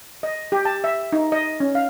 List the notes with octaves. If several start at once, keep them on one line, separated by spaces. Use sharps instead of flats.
D#5
G4
A5
E5
D#4
D#5
C#4
F5